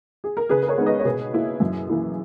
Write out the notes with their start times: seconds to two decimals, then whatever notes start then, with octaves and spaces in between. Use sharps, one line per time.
0.24 G#4
0.37 A#4
0.49 C#3 G#4 B4
0.63 B4
0.68 A#4 C#5
0.77 G#3 B3 D#4
0.86 B4 D#5
1.00 C#5
1.05 B2 G#4 B4
1.33 A#3 E4
1.60 F#2
1.89 E3 A#3 E4